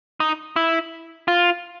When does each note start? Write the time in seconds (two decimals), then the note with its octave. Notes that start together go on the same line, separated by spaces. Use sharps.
0.20 D#4
0.56 E4
1.28 F4